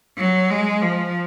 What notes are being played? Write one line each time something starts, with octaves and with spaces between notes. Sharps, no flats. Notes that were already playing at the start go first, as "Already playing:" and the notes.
F#3
G#3
F3